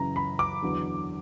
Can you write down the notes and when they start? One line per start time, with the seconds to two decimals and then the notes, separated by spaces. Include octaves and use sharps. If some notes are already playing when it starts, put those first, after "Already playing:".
Already playing: F#2 C#3 E3 A#5
0.16 B5
0.39 D6
0.62 E2 D3 F#3